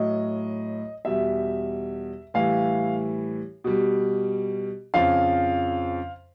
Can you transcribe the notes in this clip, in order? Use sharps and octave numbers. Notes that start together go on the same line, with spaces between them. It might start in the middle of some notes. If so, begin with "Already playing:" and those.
Already playing: A2 F#3 D#5
E2 B2 G3 E5
A2 E3 G3 F5
B2 G3
F2 C#3 F3 F5